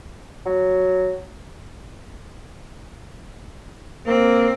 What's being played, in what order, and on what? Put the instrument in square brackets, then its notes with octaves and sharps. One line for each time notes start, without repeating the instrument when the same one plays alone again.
[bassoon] F#3
[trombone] A#3 [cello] C4